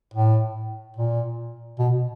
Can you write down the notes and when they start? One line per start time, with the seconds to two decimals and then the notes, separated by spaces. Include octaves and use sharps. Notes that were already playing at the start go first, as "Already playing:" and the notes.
0.14 A2
0.96 A#2
1.79 B2